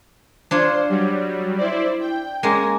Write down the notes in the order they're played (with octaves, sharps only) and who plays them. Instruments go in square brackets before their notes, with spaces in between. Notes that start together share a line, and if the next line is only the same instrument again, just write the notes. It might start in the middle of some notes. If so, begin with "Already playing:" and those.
[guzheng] D4 F4 C#5 [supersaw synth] C5
[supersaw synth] F#3 G3
E4 C5 D5
G5
[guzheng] G#3 A#3 C#4 [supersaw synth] G#6 A#6